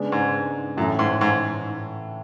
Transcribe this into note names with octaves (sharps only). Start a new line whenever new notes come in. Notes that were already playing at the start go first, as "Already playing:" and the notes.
Already playing: C#3 G#3 B3 D4
G#2
F#2 A2 E3 A3 C#4
G#2
G#2